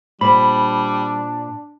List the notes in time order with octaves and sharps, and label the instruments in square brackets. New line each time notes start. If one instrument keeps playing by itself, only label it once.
[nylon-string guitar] A#2 C5 [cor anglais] G3 [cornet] D4 [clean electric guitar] B5